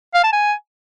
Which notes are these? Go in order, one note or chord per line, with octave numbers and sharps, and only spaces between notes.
F5
A5
G#5